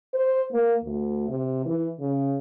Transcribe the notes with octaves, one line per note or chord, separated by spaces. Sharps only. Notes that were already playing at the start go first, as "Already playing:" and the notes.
C5
A#3
D2
C3
E3
C#3